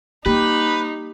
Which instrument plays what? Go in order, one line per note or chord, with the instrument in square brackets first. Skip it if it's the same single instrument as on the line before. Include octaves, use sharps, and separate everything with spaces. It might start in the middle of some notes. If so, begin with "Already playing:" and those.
[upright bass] A#3 [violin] D#4 [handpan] G4 [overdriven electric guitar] B4